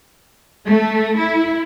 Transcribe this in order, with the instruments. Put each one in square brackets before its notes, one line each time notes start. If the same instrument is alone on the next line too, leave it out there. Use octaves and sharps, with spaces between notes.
[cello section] A3
E4